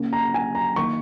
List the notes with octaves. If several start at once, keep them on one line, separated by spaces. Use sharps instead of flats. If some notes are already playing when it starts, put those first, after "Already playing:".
Already playing: C#3 A#3 C#4
A#5
G#5
A#5
D#3 A#3 C#6